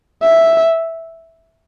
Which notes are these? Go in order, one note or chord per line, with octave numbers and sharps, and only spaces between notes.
E5